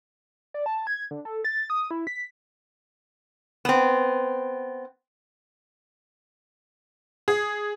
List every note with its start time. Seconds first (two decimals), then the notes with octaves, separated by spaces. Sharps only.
0.54 D5
0.66 A5
0.87 G#6
1.11 D3
1.25 A4
1.45 A6
1.70 D#6
1.91 E4
2.07 B6
3.65 B3 C4
7.28 G#4